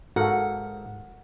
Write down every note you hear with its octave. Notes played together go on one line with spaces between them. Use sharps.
G#2 F#4 A4 A#4 F5 F#5